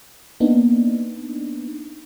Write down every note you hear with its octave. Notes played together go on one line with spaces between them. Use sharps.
A#3 B3 D4 D#4